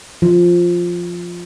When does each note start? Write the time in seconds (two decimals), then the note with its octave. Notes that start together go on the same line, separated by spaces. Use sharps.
0.22 F3